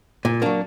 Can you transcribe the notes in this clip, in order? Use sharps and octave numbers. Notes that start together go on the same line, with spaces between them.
A#2
F#3 A#3 D4